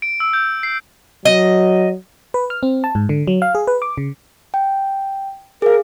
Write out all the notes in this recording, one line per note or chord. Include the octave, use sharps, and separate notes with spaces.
D7
E6
G6
C7
F#3 D#5
B4
F6
C4
A5
G#2
D3
F#3
F5
G#4
B4
D6
C#3
G5
G#4 A#4 F5